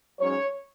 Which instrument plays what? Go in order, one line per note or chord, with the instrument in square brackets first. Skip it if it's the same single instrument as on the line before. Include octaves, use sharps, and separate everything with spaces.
[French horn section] G#2 F#3 C#4 C#5